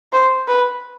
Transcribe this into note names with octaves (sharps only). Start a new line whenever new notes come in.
C5
B4